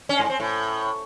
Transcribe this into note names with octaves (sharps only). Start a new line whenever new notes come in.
C#4
G#2
C4
A2